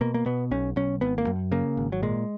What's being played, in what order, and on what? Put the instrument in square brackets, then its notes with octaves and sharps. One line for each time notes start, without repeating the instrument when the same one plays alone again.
[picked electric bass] B2 A#3
A#3
B2 B3
B1 C#4
B1 C#4
G#1 B3
A#3
F#2
C#3 A#3
G#1
F#3
A#2 G#3